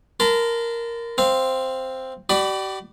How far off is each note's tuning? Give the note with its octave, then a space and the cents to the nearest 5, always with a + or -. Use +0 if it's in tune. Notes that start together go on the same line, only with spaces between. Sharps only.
A#4 +0 A5 +0 C6 -45
C4 +0 F5 -15
G4 -40 D5 +15 B5 +10